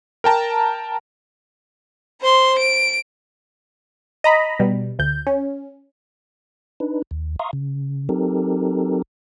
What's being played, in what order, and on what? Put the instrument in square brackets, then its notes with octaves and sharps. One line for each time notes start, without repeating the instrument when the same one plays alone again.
[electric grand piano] A#4 G5 A5 A#5
[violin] C5 C6
D7
[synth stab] D#5 A#5 B5
B2 G3
D2 G6
C#4
[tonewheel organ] D4 D#4 B4
D#2
E5 F5 A#5 C6 C#6 D#6
C#3
F#3 C4 D#4 G4 A4 A#4